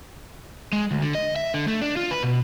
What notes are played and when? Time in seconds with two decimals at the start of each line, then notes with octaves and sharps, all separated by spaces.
0.73 G#3
0.91 D2
1.02 D3
1.15 D#5
1.36 E5
1.54 D3
1.68 A3
1.81 D4
1.97 F4
2.11 B4
2.23 B2